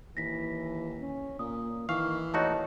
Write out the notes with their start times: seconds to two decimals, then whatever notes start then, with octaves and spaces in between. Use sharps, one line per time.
0.17 D#2 E3 A#6 B6
1.00 C#4
1.39 A#2 A#3 D#6
1.89 D#3 E3 F5 C#6
2.34 D#2 A3 D#4 F#4 C#5 D#5 A5